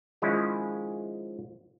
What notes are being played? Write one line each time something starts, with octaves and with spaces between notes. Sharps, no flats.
D#3 F3 G#3 C#4 E4 G#4